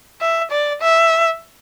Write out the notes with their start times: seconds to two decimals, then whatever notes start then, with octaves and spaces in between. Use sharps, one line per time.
0.21 E5
0.52 D5
0.82 E5